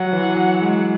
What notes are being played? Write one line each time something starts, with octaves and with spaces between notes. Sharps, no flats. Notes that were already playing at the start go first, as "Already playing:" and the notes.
Already playing: F#3 F#5
E3
F#3
G#3